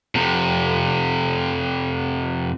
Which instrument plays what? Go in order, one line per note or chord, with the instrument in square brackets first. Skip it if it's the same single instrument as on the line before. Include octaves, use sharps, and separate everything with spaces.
[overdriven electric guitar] F2 C3